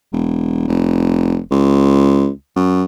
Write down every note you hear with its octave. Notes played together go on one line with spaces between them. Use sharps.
E1
F1
C#2
F#2